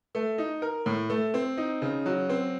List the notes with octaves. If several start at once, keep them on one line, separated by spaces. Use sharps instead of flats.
A3
D#4
A#4
A2
A3
C4
D#4
C#3
F#3
C4